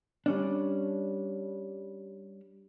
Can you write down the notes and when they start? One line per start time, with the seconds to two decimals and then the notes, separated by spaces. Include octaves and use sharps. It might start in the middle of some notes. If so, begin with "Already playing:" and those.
0.26 G3 C#4 D4